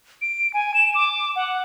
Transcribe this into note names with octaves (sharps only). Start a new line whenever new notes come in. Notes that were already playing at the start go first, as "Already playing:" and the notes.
D7
G#5
E7
D6
F#5